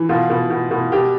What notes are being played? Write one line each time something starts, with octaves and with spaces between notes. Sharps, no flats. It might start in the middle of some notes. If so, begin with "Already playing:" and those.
Already playing: E3
B2 F4
B2
B2
B2
B2 G4